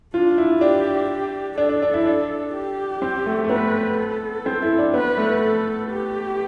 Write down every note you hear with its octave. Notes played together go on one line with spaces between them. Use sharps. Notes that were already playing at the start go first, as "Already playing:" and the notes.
D4 F4
E4
D4 G4
G4
D4 A4
D4
D4
E4
D4 A4
G4
C4
A3
A3
B3 B4
A4
C4
E4
D4
B3 B4
A3
A4
G4